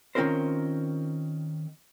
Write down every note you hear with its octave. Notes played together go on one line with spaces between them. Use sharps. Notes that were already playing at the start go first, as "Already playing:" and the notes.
D#3 C4 C#4 F4 A#4 C5